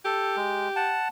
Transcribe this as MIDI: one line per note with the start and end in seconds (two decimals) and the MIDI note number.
0.05 0.96 67
0.05 0.36 69
0.36 0.69 56
0.76 1.08 78
0.76 1.08 81